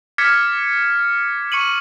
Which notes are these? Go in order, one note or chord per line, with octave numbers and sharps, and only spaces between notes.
D6 F6 G#6 A6 B6 C#7
C#6 C#7 D#7 F#7